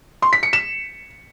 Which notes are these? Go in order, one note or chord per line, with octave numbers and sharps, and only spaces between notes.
C6
B6
C#7
E7